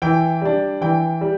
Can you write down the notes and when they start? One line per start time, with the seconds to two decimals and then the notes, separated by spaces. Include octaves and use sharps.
0.02 E3 G5
0.42 G3 D4
0.81 E3 G5
1.21 G3